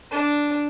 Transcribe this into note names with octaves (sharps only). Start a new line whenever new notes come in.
D4